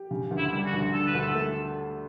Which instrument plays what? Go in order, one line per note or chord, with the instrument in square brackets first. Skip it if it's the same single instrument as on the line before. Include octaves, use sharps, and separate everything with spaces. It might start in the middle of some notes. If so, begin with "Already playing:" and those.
Already playing: [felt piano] G4
C#3
D2
[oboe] E4
[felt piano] G3
[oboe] F#4
[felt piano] D2
[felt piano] D3 [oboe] A4
[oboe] B4
[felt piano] D2
[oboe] A4
[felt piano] A3